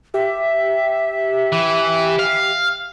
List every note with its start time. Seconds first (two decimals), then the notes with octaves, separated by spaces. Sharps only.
0.14 G4 E5
1.52 E3
2.19 F5